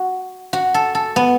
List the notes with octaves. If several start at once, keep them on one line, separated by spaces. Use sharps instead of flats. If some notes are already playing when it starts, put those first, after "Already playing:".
Already playing: F#4
F#4
A4
A4
B3